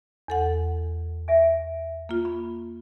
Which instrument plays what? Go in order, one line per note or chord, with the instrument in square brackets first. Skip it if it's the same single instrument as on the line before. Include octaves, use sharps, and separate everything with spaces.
[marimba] E2 A4 F#5
[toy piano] E5 G#5
[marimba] A#3 F4
[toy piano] B5